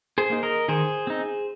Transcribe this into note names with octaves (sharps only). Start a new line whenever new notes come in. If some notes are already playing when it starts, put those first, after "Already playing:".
G#4 C5
A#3 D#4
A#4 D#5
D#3 G#4 C5
C4 D#4